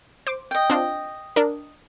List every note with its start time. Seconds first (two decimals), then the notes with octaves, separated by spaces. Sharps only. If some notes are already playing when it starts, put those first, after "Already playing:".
0.27 C5 D6
0.51 D#5 G5
0.70 C4 D4 F4
1.36 D4 A#4